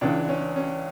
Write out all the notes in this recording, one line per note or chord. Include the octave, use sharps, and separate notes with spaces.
C#2 C#3 E3 D4
C#4
C#4